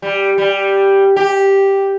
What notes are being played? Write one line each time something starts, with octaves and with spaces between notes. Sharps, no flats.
G3
G3
G4